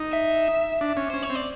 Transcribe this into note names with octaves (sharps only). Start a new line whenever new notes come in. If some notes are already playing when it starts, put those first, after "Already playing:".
Already playing: D#4
E5
D4
C#4
C#4 C5
C#5
C4
D5